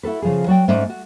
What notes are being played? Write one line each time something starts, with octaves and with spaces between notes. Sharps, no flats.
E4 F#4 A4 B4
C#3 F3 G#4
F#3 F#4 D5 G5
G#2 A3 C#4 D#4 D5
F#4